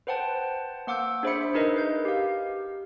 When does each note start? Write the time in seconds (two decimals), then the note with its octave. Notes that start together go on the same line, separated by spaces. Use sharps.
0.07 B4 C5 F#5 G5 A5
0.87 A#3 F#5 D6 E6 G6
1.23 D4 G#4 C5 E5 B5 C#7
1.54 D#4 G#4 A#4 B4 D#5
1.76 B4 G6
2.05 G4 F5